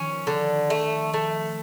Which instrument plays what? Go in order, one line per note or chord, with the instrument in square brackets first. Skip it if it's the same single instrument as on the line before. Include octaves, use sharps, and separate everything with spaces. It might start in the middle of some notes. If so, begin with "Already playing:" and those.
Already playing: [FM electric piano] D#3 F3 [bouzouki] C#4
[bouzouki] D3
A3
A3